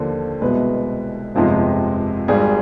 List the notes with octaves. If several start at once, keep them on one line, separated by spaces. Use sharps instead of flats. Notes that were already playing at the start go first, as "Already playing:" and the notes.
Already playing: D#2 D3 F3 C5
C2 B2 G#3 B4
G1 F2 C3 F3 G#3
G#1 G#2 G3 G#4